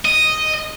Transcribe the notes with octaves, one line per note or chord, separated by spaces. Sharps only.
D#5